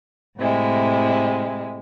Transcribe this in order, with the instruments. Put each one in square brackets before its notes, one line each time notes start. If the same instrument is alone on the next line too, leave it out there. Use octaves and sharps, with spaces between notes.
[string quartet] A2 C3 G#3 E4